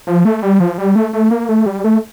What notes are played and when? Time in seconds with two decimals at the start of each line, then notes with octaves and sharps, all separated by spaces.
0.07 F3
0.25 A3
0.43 G3
0.60 F3
0.78 G3
0.96 A3
1.13 A3
1.31 A#3
1.49 A3
1.66 G3
1.84 A3